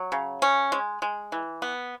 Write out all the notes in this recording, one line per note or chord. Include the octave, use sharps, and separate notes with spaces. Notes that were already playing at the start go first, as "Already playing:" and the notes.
Already playing: F#3
C#3
C#4
G#3
G#3
E3
B3